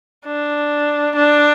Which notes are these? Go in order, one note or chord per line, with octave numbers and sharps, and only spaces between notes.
D4
D4